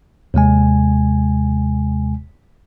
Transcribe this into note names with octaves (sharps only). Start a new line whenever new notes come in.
D#2 C3 G#3 G#5